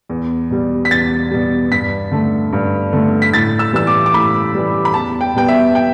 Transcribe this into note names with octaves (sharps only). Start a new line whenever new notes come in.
E2
B2 G3
B6
E2 A6
B2 G3
G2 B6
D3 A3
G2
D3 A3
B6
A2 A6
E6
E3 G3 E6
D6
D6
A2 B5
E3 G3
B5
E2 A5
G5
B2 G3 B3 G5
E5
G5